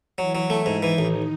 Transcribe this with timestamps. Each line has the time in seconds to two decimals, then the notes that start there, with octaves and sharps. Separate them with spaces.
0.18 E3 F#3 E4
0.35 F#3
0.50 A3
0.66 G#2
0.82 D#3 E3 D#4
0.98 A1